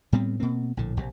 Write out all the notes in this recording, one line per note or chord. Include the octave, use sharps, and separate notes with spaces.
A2 G3 B3 C4
B2 A#3 C4
A#1 A2 D3
A#1 C3